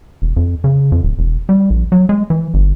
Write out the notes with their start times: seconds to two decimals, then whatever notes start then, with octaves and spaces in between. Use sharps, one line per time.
0.22 E1
0.36 F2
0.64 C#3
0.92 F2
1.03 D1
1.19 E1
1.49 G3
1.70 A#1
1.92 F#3
2.09 G#3
2.30 E3
2.54 G1